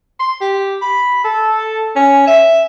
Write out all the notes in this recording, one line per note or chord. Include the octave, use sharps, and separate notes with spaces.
C6
G4
B5
A4
C#4
E5